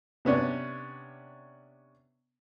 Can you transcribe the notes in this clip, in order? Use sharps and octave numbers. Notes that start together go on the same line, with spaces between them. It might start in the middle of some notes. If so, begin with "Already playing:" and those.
C3 B3 C#4 D4